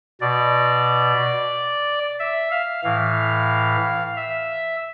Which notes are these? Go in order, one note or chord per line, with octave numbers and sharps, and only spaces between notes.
B2 D5
E5
F5
A2 E3 F5
E5